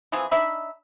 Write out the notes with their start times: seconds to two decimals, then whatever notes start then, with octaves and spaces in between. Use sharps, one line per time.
0.12 E3 F3 C4 G#4
0.31 D4 D#4 E5 B5